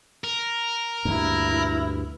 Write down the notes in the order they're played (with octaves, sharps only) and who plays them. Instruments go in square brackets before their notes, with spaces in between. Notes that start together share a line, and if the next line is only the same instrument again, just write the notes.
[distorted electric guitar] A#4
[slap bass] D2 G2 [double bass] A#2 E4